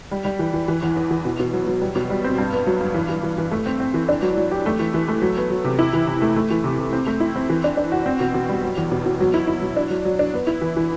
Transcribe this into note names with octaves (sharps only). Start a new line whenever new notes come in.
G3
G3
E3
E3
E3
E2
E2
E3
B2
B2
F#3
F#3
G3
B2
G3
C4
G2
B3
F#3
G2
E3
E3
E3
E3
A3
C4
C4
E3
D4
F#3
F#3
G4
A3
E3
E3
A3
F#3
B3
F#3
C3
E4
E3
C3
A3
A3
E3
C3
C3
C4
A3
E4
C4
E3
D4
D4
F#4
C4
B2
B2
G3
F#3
E2
B2
B2
F#3
E4
E4
F#3
D4
F#3
F#3
D4
B3
E4
E3
E3